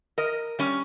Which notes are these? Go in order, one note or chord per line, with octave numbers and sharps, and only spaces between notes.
A#4 D#5
G3 C#4